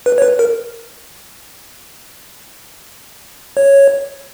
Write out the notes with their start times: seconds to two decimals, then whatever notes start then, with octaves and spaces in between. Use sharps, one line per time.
0.06 B4
0.18 C#5
0.22 B4
0.39 A#4
3.57 C#5